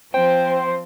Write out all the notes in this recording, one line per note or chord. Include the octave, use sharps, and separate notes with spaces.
F3 C4 C5 G5